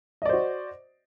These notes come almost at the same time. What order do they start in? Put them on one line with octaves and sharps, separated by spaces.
D#5 D5 C5 F#4